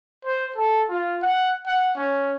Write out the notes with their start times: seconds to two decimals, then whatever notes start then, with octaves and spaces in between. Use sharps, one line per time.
0.25 C5
0.56 A4
0.89 F4
1.22 F#5
1.66 F#5
1.96 C#4